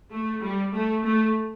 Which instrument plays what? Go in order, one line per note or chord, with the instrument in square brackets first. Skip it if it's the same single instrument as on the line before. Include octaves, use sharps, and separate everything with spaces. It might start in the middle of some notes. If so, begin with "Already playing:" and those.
[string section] A3
G3
A3
A3